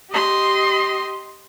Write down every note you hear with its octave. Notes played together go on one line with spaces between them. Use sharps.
G4 D#5 C6